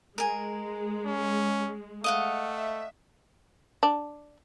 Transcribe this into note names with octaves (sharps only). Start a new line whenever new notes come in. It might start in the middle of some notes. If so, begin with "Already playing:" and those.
G#3 A#4 G#5
C#4
A3 D#5 F5 F#5
E5
D4